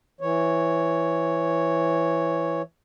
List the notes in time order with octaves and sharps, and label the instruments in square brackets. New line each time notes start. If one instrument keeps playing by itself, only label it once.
[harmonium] E3 C#5